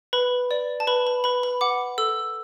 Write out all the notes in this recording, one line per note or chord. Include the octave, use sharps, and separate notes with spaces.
B4 B5
D5
A5
B4 B5
B5
B4 B5
B5
F#5 D6
A4 E6